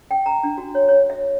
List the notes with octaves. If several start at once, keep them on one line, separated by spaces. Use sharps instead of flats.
G5
A#5
D4
F#4
C#5
C#5
E5